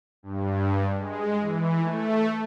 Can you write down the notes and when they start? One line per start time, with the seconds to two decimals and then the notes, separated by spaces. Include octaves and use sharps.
0.23 G2
0.97 G#3
1.40 E3
1.81 A3